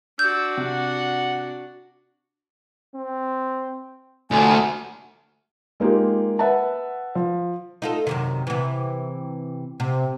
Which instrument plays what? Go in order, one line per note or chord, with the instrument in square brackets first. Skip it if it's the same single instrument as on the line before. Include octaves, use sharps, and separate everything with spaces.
[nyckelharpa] D4 F#4 [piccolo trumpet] E6 [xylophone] G6
[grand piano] C3 [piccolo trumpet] F#5
[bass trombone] C4
[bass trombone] F1 [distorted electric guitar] D2 [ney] G#5
[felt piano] G#3 A#3 D#4 F4 G4
B4 E5 F#5 A5
F3
[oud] D#4 F4 A4
F#2 C3 D#3
C3 E3
C3